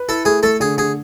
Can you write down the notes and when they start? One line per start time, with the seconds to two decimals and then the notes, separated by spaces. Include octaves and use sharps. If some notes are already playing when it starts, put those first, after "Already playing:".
Already playing: B4
0.08 E4 A4
0.25 A3 G#4
0.43 A3 A4
0.60 D3 G#4
0.77 D3 G#4